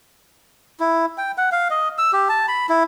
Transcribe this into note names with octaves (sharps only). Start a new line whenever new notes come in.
E4
G5
F#5
F5
D#5
E6
G4
A5
B5
E4